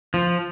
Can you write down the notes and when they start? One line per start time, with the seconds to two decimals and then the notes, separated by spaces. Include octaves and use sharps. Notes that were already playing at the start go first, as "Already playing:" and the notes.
0.14 F3